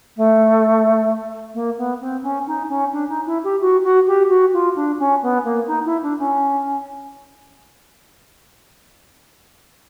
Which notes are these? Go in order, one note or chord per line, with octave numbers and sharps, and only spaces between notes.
A3
A#3
B3
C4
C#4
D#4
C#4
D4
D#4
E4
G4
F#4
F#4
G4
F#4
F4
D4
C#4
B3
A#3
D#4
E4
D4
C#4